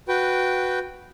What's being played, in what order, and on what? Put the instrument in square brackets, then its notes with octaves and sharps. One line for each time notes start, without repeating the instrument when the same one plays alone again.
[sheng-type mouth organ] F#4 B4 G5